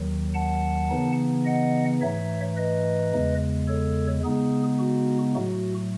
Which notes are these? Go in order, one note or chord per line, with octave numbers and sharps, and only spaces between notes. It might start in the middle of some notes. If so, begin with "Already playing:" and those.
Already playing: D#2 D#3 F#3
F#5 A5
C#3 E3 B3 D#4
D#5 F#5
G#2 E3 A3 D#4 C#5 E5
B4 D#5
E2 C#3 G#3
A4 C#5
C#3 G#3 B3 D#4 G#4
F#4
A2 F#3 A3 F#4